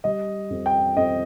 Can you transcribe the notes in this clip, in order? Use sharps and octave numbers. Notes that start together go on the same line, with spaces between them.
G3 D#5
F2
G5
F2 D#5